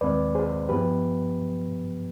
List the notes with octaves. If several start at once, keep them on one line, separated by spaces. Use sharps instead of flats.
D#2 D#3 G#3 C4 B4 D5
G#4 C5
G2 F3 B3 G4 B4